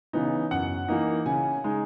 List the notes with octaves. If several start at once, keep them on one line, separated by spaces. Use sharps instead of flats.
C#3 E3 B3 D#4
F#2 F#5
E3 A#3 D#4
C#3 G#5
G#3 D#4